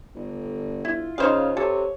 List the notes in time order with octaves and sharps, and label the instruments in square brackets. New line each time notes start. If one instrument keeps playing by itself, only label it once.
[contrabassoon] G1 [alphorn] D3
[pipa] E4 [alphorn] F4
[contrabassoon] C#3 [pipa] D#4 C5 F5
[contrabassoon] C3 [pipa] A4 [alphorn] C#5